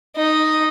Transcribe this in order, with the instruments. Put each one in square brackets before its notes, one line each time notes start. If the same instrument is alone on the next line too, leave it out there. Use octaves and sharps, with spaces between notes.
[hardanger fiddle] D#4